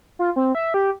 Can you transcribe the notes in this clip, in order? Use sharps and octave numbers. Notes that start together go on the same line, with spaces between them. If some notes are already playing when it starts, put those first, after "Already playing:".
F4
C4
E5
G4